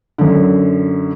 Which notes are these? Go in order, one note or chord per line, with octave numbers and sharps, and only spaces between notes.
F#2 D3